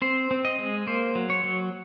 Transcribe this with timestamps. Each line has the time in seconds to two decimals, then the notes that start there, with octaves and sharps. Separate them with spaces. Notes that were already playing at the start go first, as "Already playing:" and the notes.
0.02 C4 C5
0.31 C4
0.45 D#5
0.59 G#3
0.87 A#3 C5
1.15 F#3
1.30 C#5
1.44 F#3